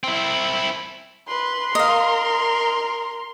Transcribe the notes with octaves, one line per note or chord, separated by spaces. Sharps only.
C4 E4
B4 C6
A#4 D#5 F5